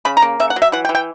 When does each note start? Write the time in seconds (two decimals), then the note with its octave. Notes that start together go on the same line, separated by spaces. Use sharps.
0.05 C#3 B5
0.17 A#5
0.22 A#3
0.40 C#3 E5
0.50 F#5
0.56 F#3
0.62 E5
0.72 E3 F#5
0.85 G5
0.89 E3
0.95 G5